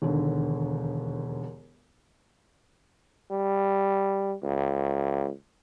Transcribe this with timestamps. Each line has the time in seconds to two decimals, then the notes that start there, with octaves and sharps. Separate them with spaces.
0.02 E1 D#2 D3
3.31 G3
4.43 C#2